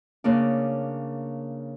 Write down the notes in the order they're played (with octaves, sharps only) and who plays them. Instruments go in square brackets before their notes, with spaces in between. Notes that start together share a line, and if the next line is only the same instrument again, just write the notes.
[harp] C#3 A#3 D4